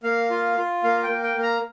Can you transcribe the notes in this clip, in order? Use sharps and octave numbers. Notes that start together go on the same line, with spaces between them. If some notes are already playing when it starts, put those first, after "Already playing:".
A#3 F5
F4
F4
A#3 F5
G5
A#3
G5
A#3
A#5